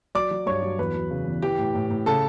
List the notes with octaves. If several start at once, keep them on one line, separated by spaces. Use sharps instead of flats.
F#3 D5 D6
F#3
G2 C#5 C#6
F#3
E2 B4 B5
F#3
C#3
E2
E3 G4 G5
A2
A2
A2
C#3 A4 A5